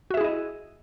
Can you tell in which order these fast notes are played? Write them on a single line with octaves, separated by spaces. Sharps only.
F#4 E5 G#4 E4 D#5